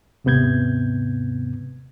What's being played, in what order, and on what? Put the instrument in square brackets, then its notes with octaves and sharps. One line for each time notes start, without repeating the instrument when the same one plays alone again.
[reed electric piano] D#2 G#2 C3 B3 G6 G#6